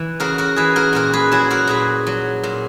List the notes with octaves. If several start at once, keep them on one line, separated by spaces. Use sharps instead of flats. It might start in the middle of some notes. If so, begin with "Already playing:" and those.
Already playing: E3
C#3 F#4 A#4
F#4 A#4
E3 G#4 B4
F#4 A#4
A#2 F#4 A#4
G#4 B4
F#3 E4 G#4
F#4 A#4
A#2 G#4 B4
F#3
A#2